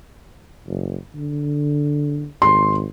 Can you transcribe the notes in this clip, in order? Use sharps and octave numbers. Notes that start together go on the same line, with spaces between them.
F#1
D3
G#1 C6